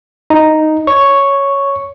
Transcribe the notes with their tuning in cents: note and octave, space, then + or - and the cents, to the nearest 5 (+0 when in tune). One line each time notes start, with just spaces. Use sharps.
D#4 +0 A#5 +0
C#5 +0 C#6 +0